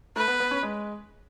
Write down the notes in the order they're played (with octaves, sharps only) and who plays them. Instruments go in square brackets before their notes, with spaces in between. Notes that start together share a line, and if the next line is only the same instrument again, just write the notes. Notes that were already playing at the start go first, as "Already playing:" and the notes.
[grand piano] A3 [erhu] B4
[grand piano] B3
B3
C#4
G#3